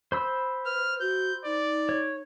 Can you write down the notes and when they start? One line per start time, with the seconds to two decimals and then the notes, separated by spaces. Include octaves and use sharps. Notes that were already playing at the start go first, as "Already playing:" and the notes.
0.12 C5 B5 E6
0.66 B4 F6
1.01 F#4 G6
1.45 D#4 D5
1.89 C#5